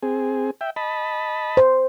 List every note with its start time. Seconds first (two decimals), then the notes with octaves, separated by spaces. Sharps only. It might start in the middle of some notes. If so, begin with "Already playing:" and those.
0.03 C4 G#4
0.61 E5 G5
0.76 D#5 A5 B5
1.57 C5